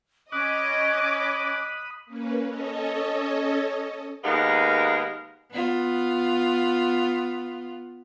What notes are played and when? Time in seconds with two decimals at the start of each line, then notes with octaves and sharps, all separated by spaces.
0.32 C#4 C#5 D#5 B5 D6 D#6 F#6
2.06 A#3 C#4 B4
2.47 C#4 A4 C#5 D#5
4.24 D#2 G#3 B3 A#4 F5
5.51 B3 F4